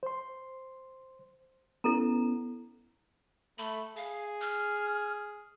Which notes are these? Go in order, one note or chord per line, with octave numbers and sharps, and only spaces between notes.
C5 C6
B3 C#4 E4 A4 A#5
A3 B5
G#4 F5
F6